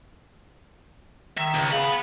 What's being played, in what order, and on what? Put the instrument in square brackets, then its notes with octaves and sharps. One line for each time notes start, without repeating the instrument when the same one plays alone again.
[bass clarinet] D#3 [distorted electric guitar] E5
[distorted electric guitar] C#2
[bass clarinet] C#3 [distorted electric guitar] F#5 B5